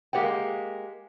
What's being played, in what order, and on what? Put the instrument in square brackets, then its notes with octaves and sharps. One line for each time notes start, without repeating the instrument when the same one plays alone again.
[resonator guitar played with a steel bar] G#3 A#3 G4 C#5 F#5 G5